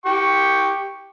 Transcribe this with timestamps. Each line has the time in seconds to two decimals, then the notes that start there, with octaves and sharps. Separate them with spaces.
0.06 G4 G5 C#6